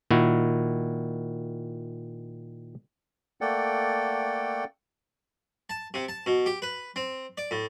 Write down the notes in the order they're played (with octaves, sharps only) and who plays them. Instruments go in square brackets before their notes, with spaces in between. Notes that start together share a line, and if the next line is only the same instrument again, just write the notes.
[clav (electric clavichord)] A#2 D#3 E4 F#4
[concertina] A3 A#3 A4 D5 F#5 G5
[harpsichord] A5
C3
A5
B2
G4
B4
C4
D5
A2